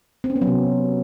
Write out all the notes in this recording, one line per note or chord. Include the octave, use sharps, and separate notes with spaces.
C4
C#4
B3
F#3
C3